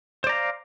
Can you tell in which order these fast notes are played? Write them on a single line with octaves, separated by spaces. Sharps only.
C5 D5 A#5 F5